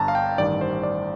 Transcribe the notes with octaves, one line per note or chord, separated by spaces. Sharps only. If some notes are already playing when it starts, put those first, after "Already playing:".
Already playing: G1 G2 D3 A5 A#5
F5
G5
A1 G2 D#3 G3 D5
C5
D5